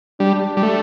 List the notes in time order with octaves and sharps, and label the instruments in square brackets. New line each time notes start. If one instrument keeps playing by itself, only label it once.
[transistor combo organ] G3 [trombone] D4
[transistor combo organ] G3
A3